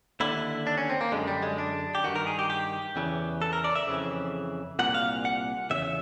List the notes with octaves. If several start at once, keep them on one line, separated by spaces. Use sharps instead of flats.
D#2 D3 E4
D4
C#4
C4
A#3
F#2 D3 G#3
G3
G#3
D4
G4
G2 D#3 F#4
A#4
G#4
G4
G4
E2 C#3 E3
A4
A#4
D5
E5
F2 C#3 E3
C2 A#2 F#5
F5
F#5
E2 C#3 E5